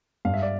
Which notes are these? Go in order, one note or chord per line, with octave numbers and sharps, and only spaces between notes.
G2 F5
E5
D5